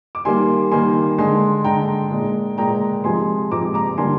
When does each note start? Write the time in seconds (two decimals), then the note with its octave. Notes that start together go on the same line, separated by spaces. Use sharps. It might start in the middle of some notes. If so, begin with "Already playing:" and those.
0.15 D6
0.25 D#3 G3 A#3 G#5 C6
0.72 D#3 G3 A#3 G#5 C6
1.18 D3 G#3 G#5 C6
1.64 D3 G#3 G5 A#5
2.11 A#2 G#3
2.58 A#2 G#3 G5 A#5
3.04 C3 F3 G#3 G#5 C6
3.51 C3 F3 G#3 A#5 D6
3.74 A#5 D6
3.97 D3 G3 A#3 G#5 C6